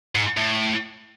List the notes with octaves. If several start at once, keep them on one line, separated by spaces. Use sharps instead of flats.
G#2
A2